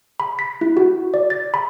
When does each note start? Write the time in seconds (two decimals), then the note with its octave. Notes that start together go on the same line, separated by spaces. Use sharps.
0.20 B5
0.39 B6
0.61 E4
0.77 F#4
1.14 D5
1.30 A6
1.54 B5